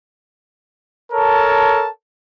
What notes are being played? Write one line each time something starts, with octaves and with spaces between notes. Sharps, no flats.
A4 A#4 C#5 A5